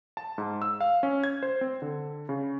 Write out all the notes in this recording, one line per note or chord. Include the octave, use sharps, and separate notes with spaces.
A5
G#2
E6
F5
C#4
G#6
C5
C4
D3
C#3